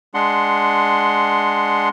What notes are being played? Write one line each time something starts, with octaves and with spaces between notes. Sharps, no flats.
G#3 D4 F#5 C6